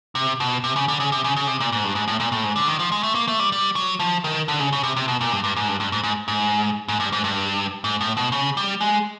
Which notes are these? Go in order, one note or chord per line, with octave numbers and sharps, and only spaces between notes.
C3
B2
C3
C#3
D3
C#3
C3
C#3
C#3
C3
A#2
G#2
G2
G#2
A2
A#2
A2
G#2
D3
D#3
F3
G#3
A3
A#3
A3
G3
G3
F#3
F3
D#3
D3
C#3
C#3
C3
C3
B2
A#2
G2
G2
G#2
G2
G2
G#2
G#2
G#2
G#2
G2
G#2
G2
G#2
A2
B2
C#3
G3
G#3